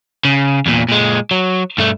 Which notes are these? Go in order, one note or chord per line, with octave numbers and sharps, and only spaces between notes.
C#3
E2 A#2
A#2 G#3
F#3
G2 A3